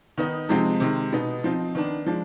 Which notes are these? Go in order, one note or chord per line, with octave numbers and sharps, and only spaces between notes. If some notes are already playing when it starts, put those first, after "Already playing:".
D#3 B3 D#4
C3 F3 G#3 C4 D#4
C3 D#3 G#3
B2 B3 D#4
F3 C4 D#4
D#3 B3 D4
F3 G#3 D4